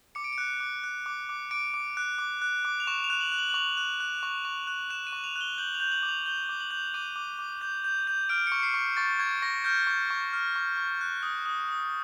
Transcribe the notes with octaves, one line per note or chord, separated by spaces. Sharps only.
D6 C#7
D7
C#7
F#6
D6
F#6
D6
D6
D6 D7
D6
F#6
D6
F#6
D6
F7
C#6 E7
F7
F#6
F#7
F#6
F#7
F#7
C#6 F7
F#6
F#6
C#6
C#6
F#6
F#6 E7
D#7
C#6
F7
F#6
G7
G6 F#7
F7
G6
F#7
D6
F7
G6 G7
D6
F#7
G6
D6 D#7
D6
D6
G6
G6
G6
F6 D7
C#7
C#6
C#7
C7
C#6
C#6 A6
C#6 G#6
C#6 A#6
F6 G6
C#6
C#6
F6
C#6
C#6
F#6
D#6
D#6
D#6